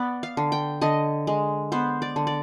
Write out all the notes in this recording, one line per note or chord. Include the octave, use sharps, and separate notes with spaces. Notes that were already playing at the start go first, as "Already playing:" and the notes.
Already playing: B3 D5
F5
D3
G5
D3 D#5
G#3
B3 C5
D5
D3
D5